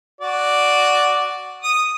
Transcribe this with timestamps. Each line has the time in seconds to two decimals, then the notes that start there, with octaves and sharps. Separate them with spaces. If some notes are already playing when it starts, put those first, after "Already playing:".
0.21 F#4 D5
1.63 D#6